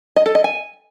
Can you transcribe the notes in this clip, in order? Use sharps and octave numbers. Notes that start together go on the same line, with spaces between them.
D#5
A4
D#5
G#5